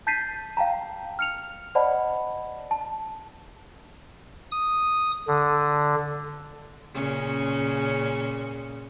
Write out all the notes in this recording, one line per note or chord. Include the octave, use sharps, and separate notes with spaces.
A5 G6 A6 B6 C7 D#7
F5 G5 A5 A#5
F6 C#7 F7
C5 D5 D#5 F#5 A5 B5
A5
D#6
D3
A#2 C#3 C#4